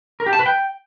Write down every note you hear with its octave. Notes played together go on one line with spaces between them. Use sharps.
A#4
G4
A5
B4
G5